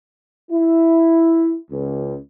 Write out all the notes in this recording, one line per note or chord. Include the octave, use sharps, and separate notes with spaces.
E4
C#2